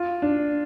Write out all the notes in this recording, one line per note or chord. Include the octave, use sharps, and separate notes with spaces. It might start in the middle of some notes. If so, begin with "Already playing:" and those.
Already playing: F4
D4